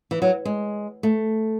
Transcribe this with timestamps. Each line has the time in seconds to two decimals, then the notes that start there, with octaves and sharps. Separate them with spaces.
0.11 E3
0.22 F#3
0.45 G#3
1.03 A3